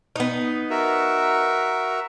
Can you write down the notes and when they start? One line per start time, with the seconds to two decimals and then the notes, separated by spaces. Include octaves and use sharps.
0.16 B3 D#4
0.70 F#4 A#4 E5